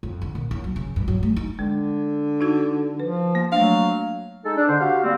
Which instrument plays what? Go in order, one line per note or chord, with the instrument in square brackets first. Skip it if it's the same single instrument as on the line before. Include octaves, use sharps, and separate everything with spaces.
[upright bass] F2
D3
A#1
D#2
F#3
C#3
G2
F#3
A3
D#4
[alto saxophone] D3 [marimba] G#3
[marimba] D#4 F#4 G#6
[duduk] F3 [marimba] B4
[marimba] A#3
[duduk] F#3 [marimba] A3 D4 [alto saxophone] F5
[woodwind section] G#3 D#4 A4
D4
D3 C5
F#4 G4 F5
G3 A#3 C4